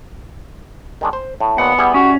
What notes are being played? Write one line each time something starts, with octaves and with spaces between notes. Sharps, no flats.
D#3 G#3 D4
C5
A2
D#2 A#2 B3 F#5
G3 E4 G#4
C#4 F#4